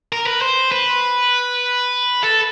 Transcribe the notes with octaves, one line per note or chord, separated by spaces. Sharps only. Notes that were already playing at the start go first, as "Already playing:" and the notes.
A#4
B4
C5
B4
A4